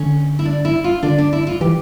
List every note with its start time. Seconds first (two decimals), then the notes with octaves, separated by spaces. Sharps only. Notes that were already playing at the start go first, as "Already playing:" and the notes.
Already playing: D3 C#4
0.39 E4
0.45 D4
0.65 E4
0.84 F4
1.03 D3 D4
1.18 D4
1.33 E4
1.47 F4
1.61 E3 G4